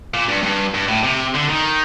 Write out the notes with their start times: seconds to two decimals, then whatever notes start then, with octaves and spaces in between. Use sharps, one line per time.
0.14 A#2
0.29 G2
0.43 G2
0.74 G2
0.88 A2
1.03 C3
1.34 D3
1.49 D#3